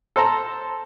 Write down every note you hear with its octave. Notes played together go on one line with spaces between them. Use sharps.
A4 C5 A5 A#5